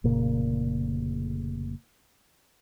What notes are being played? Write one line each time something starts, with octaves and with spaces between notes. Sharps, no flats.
F1 A#2 C#3 A#3